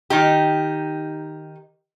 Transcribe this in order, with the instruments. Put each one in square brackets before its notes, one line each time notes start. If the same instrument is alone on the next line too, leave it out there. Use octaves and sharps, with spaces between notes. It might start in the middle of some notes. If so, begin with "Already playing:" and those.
[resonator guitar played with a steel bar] D#3 D#4 G4